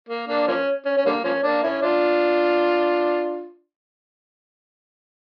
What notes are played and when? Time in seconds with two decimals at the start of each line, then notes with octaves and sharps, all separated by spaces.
0.09 A#3
0.28 A#3 D4
0.48 F3 A#3 C#4
0.85 C#4
0.97 C#4
1.06 D3 G3 A#3
1.24 F3 A#3 C#4
1.43 A#3 D4
1.63 C#4 E4
1.82 D4 F4